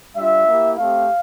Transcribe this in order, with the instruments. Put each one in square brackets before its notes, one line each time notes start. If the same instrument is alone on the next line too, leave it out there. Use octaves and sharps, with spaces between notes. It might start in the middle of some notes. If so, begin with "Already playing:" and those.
[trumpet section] G3 D4 F4 E5
A#3 E4 G4
A3 C4 G4 F5